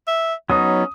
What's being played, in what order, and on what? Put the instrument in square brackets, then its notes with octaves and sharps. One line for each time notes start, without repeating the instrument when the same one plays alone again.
[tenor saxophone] E5
[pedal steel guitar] F#3 B3 D#4 [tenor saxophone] C#4 [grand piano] D#6